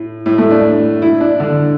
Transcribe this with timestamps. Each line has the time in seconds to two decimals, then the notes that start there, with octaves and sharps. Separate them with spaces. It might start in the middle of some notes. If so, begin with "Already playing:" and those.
Already playing: A2
0.26 A2
0.38 A3
0.51 D4
1.02 E4
1.20 D4
1.40 D3